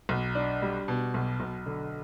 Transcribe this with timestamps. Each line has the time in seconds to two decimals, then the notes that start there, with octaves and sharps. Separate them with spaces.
0.09 B1
0.35 D4
0.62 G3
0.88 B2
1.14 B1
1.40 B1
1.66 D3